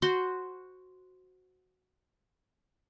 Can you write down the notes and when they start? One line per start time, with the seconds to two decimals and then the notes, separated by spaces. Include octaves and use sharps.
0.02 F#4 C5 C6